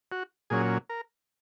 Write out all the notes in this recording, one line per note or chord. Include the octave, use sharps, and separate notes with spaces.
F#4
A#2 F#3 C#4 G#4
A#4